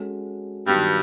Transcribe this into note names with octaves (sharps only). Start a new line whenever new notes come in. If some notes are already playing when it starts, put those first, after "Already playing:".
Already playing: G#3 C#4 F#4 A4
G2 D#3 F#3 B3